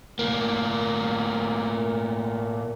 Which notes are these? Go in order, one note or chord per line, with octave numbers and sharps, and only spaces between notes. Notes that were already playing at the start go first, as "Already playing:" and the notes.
A2 A#3